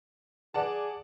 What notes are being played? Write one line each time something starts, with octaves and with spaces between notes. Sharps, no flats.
G#4 D5 F#5 A5